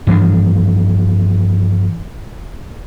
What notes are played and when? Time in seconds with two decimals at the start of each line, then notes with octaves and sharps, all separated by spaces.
0.07 G2 E3 F3 D4